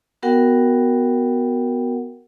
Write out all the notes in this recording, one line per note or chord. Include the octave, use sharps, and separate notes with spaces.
B3 F#4 A#4 F#5 G5